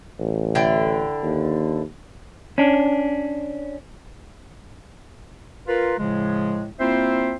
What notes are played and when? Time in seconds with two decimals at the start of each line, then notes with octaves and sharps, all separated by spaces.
0.19 A1
0.55 D3 E4 G5
1.23 D#2
2.58 C#4 D4
5.68 F4 A#4 B4
5.98 A2 C#3 F3 G#3
6.80 A#3 C4 E4 F4 C5 E5